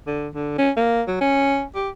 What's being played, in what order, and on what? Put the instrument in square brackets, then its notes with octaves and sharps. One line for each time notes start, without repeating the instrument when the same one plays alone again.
[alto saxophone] D3
D3
C#4
A#3
F#3
C#4
G4